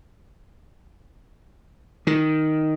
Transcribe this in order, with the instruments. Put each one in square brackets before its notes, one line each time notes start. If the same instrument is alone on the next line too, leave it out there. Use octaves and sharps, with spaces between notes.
[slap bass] D#3